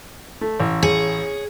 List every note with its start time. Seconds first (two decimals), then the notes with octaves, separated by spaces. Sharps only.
0.41 A3
0.60 A1
0.83 G#4 C#5